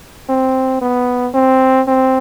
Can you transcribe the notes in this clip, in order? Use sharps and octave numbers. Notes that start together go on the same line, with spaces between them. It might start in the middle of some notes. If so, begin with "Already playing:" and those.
C4
B3
C4
C4